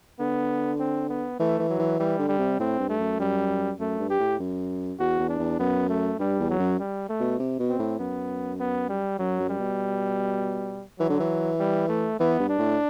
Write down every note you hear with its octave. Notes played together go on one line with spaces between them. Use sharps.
D3 B3
C4
B3
E3 A3
E3
F#3
E3
E3 G3
D3
G3
C3
A2 C4
G2
A3
F#2
F#2 G3
F#2 A3
G2
G4
A2
F#2
E2 F#4
E2
D4
E2
F#2 B3
A3
G2 G3
E2
F#3
F#2
G3
A3
B2
C3
B2
C4
A2
F#2 B3
B3
G3
F#2 F#3
F#2
G3
B2
E3 F#3
D3
E3
G3
A3
E3 B3
G2
D4
A2